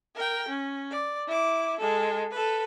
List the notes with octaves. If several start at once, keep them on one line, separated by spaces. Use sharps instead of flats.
A#4 G5
C#4
D5
E4 D6
G#3 A4
A4 B4